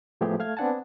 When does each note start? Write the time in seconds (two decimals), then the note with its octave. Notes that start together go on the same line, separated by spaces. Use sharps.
0.21 A2 F3 A3 B3 G4 G#4
0.39 A3 F5 F6 G#6
0.57 B3 C4 D4 F#5 G#5 A5